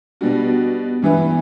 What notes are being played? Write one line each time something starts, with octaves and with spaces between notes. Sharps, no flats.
B2 G3 D4 F#4
G2 E3 B3